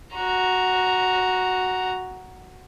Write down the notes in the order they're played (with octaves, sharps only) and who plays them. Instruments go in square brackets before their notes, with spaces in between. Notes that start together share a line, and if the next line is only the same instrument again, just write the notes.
[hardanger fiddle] F#4 A#5